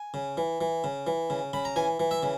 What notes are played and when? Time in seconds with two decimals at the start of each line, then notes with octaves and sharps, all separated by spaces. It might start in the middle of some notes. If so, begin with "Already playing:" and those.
Already playing: G#5
0.14 C#3
0.37 E3
0.61 E3
0.84 C#3
1.07 E3
1.30 C#3
1.53 C#3 B5
1.65 A#5
1.76 E3 G#5
2.00 E3
2.11 E5
2.23 C#3